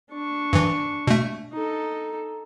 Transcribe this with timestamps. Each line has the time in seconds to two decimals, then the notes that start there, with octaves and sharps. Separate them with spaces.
0.11 D4 C#6
0.53 G2 E3
1.07 B2 A3
1.52 D#4 A4